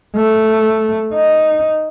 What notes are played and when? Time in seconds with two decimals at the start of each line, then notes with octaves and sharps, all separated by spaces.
0.16 A3
1.14 D#4